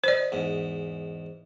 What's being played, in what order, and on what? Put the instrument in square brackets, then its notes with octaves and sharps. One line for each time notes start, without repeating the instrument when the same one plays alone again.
[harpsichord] B4 D#5 [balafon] C5 D5
[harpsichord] E2 G#2